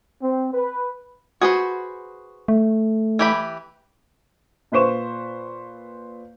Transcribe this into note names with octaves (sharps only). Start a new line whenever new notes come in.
C4
B4
F#4 G#4 B4 C5
A3
E3 G4 B5
A#2 F4 B4 C5 C#6 E7